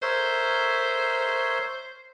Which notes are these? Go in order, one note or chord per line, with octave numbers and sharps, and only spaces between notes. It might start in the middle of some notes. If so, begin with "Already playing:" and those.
A#4 C5 C#5 E5